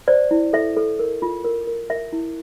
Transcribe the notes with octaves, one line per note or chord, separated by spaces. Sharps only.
C5 D5
E4
A4 E5
A4
A#4
F4
A#4
A#4
A#4 E5
E4